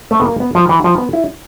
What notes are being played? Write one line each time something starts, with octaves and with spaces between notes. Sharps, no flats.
A3
B3
A#3
B3
F3
E3
F3
B3
E4